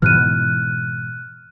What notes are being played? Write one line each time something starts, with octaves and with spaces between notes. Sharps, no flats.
G#2 B2 E3 F6 F#6 D#7